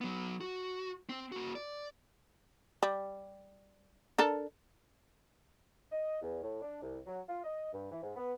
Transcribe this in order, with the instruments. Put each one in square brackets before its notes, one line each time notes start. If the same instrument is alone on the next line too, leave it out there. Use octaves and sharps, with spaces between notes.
[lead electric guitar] F#3 B3
F#4
C4
A#3 F#4
D5
[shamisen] G3
D4 A4 A#4
[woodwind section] D#5
E2
A2
D4
C2
F#3
F4
D#5
G2
E3
G#2
B3